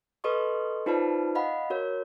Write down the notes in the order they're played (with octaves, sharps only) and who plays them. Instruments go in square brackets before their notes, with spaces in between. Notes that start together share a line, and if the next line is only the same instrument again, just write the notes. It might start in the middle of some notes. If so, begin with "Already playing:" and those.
[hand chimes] A4 B4 D#5 C6 C#6
D#4 F4 B4 C5 D5 A5
D#5 F5 F#5 B5
F#4 A#4 C#5